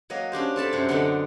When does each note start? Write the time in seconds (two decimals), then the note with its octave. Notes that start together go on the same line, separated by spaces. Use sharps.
0.10 F#3 A#3 D#5
0.32 C#4 D4 G4 C5
0.56 C4 A4 A5 B5
0.73 F#2 C3
0.89 D3 B3 C4 D4 D#4